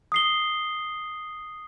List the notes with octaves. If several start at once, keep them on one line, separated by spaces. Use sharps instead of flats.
D#6 C7 G7